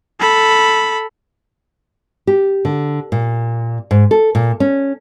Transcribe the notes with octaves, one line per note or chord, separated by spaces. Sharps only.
A4 B5
G4
D3
A#2
G#2
A4
A#2
C#4